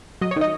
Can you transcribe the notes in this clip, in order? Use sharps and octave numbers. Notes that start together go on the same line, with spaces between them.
F#3 D#5
C#5
D#3 D#5